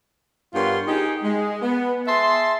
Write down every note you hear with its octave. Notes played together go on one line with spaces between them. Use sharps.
G2 B3 F4 A#4 C#5 C6
D#4 G4 G#4
G#3
B3
G#4 E5 A5 C6